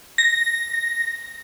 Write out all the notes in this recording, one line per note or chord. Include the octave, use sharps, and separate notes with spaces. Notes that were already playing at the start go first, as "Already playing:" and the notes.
A#6